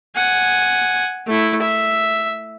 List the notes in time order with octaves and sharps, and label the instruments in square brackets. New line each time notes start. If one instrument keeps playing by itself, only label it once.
[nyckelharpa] F#5 G#5
A3 E4
E5